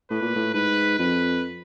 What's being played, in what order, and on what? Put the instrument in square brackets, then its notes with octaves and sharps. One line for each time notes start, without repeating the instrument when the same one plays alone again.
[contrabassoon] A2 [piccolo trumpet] B4
[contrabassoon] A#2
A2
[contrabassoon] G#2 [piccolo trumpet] B4
[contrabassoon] F2 [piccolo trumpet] B4